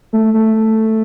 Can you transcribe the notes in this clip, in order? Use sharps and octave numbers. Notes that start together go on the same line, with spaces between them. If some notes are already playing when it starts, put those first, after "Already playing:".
A3
A3